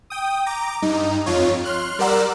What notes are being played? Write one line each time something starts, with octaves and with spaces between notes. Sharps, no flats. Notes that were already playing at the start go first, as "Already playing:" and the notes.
G5 D#6
A#5 D6
G2 D#4
F2 F4 C#5
C6 F6 F#6
G3 A#4 D5 F#5 E6